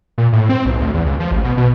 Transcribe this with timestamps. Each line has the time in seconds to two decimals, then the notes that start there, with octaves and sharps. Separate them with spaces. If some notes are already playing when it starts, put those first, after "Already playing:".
0.18 A#2
0.32 A2
0.49 C4
0.65 B1
0.80 D2
0.94 E2
1.06 C#2
1.20 F3
1.31 A1
1.44 B2
1.57 B2